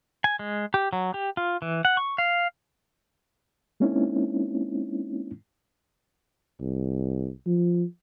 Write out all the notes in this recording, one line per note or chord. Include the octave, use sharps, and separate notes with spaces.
G#5
G#3
G4
F#3
G4
F4
E3
F#5
C#6
F5
G#3 A#3 C4 C#4 D#4 E4
C2
F3